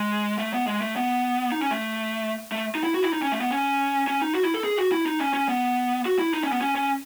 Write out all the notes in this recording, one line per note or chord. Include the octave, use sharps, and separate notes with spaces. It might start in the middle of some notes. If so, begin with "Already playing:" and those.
Already playing: G#3
A3
B3
G#3
A3
B3
D#4
C#4
A3
A3
D#4
E4
F#4
E4
D#4
C#4
A3
B3
C#4
C#4
D#4
F#4
E4
A4
G#4
F#4
E4
D#4
C#4
C#4
B3
F#4
E4
D#4
C#4
B3
C#4
C#4